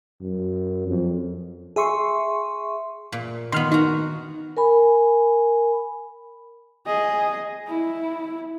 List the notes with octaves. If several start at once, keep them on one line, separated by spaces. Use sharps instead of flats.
F#2
F2
G#4 E5 C6 C#6
A#2
D#3 B3 C6 F6
D#4 F#4 A#5
A#4 G#5 B5
G#4 D#5
E4